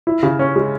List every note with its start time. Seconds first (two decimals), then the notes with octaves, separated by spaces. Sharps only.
0.07 E4
0.23 C#3
0.39 C#4
0.56 G#3